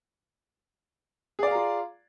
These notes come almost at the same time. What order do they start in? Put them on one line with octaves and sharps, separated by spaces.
G#4 D5 F5 A#5 F4